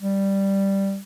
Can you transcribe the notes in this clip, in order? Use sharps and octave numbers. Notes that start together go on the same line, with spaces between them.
G3